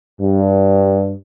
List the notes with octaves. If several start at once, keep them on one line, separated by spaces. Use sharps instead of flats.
G2